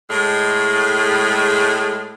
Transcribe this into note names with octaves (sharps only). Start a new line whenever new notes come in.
A2 G#3